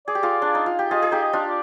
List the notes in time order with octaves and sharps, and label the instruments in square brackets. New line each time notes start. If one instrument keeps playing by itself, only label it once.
[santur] G#4 [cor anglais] D5
[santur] G4
F4 G#4
D4
D#4
F4
G4
[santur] F4 G#4 [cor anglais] D#5
[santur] G#4
D#4 G4
[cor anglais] D#5
[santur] D4 F4
[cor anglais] D5